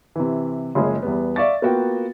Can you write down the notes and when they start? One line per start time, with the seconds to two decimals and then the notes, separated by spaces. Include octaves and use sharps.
0.16 C3 E3
0.75 F#1 F3 G#3 G#4 C#5
1.02 E2 G3 B3
1.36 D5 E5 F5 C#6 D6 A6
1.62 A#3 B3 F4 F#4 A#4 G5